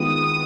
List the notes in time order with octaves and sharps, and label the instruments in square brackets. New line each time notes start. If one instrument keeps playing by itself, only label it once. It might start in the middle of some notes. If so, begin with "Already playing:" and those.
Already playing: [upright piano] D#3 G#3 B3 F4 [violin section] D#6